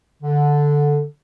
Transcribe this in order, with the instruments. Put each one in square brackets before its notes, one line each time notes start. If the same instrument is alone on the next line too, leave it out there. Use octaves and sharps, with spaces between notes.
[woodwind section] D3